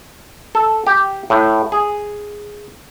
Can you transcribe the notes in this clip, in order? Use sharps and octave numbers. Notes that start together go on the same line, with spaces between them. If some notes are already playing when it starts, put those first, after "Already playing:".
A4
G4
A2
G#4